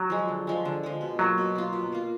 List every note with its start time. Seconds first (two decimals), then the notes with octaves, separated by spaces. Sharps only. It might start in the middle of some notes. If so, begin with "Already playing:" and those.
Already playing: F#3
0.10 F3 G#3
0.28 D3
0.47 F3 G#3
0.65 D3
0.83 F3 G#3
1.01 B2
1.19 F#3 A#3 F4
1.38 B2
1.55 A#3 F4
1.73 B2
1.92 A#3 F4